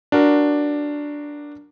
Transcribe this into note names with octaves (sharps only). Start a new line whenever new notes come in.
D4 F#4 A#4